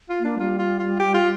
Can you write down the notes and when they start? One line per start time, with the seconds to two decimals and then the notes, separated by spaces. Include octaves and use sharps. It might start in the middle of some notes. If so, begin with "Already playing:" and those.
0.09 F4
0.20 A#3 D4
0.39 G3 F4
0.59 F4
0.79 F4
1.00 G4
1.14 F4